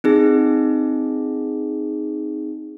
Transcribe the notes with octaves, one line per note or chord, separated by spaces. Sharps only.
C4 D#4 G#4